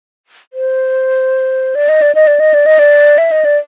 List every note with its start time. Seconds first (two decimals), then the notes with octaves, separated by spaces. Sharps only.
0.53 C5
1.75 D5
1.89 D#5
2.02 D5
2.15 D#5
2.27 D5
2.40 D#5
2.54 D5
2.66 D#5
2.79 D5
3.18 E5
3.31 D#5
3.45 D5